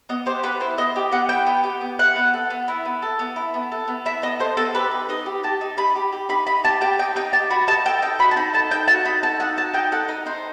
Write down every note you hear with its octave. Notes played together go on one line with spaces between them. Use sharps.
B3 D#5
G4 C5
B3 B4
E4 C5
B3 D#5
G4
B3 F#5
E4 G5
B3
G4
B3
E4 F#5
B3
A4
B3
E4
B3
A4
B3
E4
B3
A4
B3
E4 E5
B3 D#5
A4 C5
B3 A4
G4 B4
D#4
D#4 D#5
G4
G4 A5
D#4
D#4 B5
G4
G4
D#4 B5
D#4 B5
G4 A5
G4 G5
D#4 G5
D#4 G5
G4 A5
F#4 B5
D#4 A5
A4 G5
D#4 G5
F#4 B5
A5
D#4 B5
A4 A5
D#4 G5
F#4 A5
D#4 B5
A4 A5
D#4 F#5
F#4 A5
D#4 G5
A4 F#5
D#4 D#5
D#4 C5